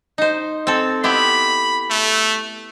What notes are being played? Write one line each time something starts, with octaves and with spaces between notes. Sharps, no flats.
D#4 C5
C4 A4
B3 E4 G4 B5
A3